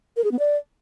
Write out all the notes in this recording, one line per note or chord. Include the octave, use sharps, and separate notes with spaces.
A#4
G#4
B3
D5